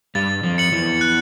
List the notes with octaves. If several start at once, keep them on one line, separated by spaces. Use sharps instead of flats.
G2 G3 A6
F2 F3
C#7 F#7
E2 E3
F#6